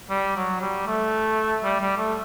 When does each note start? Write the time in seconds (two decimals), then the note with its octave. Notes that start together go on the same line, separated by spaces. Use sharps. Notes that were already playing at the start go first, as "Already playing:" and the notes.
0.10 G3
0.36 F#3
0.61 G3
0.87 A3
1.63 G3
1.80 G3
1.97 A3